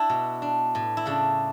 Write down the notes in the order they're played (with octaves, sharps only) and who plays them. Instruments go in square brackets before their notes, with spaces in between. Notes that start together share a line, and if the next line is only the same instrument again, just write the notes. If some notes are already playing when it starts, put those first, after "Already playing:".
Already playing: [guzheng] D4 E4
B2
D4
A2
E4
C#3 D4